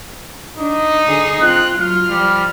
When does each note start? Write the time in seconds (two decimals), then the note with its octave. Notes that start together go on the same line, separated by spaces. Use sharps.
0.59 D4 D#4
1.05 D3 G#4
1.42 C4 F4 F#6
1.79 F#3 F4 F6
2.10 F3 G3